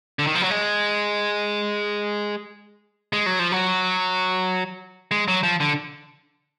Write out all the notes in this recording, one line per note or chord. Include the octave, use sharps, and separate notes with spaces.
D3
D#3
F3
F#3
G#3
G#3
F#3
F3
F#3
G#3
F#3
F3
D3